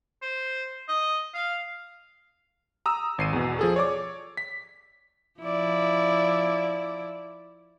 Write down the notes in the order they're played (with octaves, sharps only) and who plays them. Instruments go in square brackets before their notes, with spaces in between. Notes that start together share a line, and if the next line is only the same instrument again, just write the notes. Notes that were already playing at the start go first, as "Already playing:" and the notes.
[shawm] C5
D#5
F5
[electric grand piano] A#5 D#6 E6
G#1 C7 D#7
E2 B2
F3 G#4 A4
C#5 D5 D6
B6
[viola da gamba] F3 E4 D5